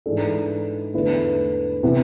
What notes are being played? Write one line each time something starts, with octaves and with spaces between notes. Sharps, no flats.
G#2 E3 G#3 D4 A4
E2 D3 A3 E4 B4
C3 E3 B3 E4